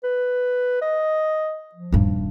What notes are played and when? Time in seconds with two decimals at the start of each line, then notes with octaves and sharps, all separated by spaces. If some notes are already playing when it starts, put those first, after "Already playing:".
0.04 B4
0.82 D#5
1.75 F3
1.92 D#1 G2